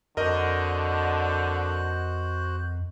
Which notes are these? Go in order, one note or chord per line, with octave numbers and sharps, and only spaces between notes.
F2 D3 F#4 A#4 C5 D#5 F#6